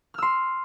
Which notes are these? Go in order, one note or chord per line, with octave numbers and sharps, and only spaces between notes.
C6 E6 F6